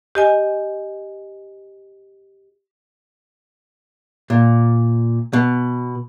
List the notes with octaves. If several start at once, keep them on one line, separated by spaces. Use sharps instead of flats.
G4 D#5 G#5
A#2
B2